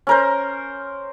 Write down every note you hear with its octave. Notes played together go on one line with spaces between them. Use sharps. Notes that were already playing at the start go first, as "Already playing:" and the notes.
C#4 A#4 C5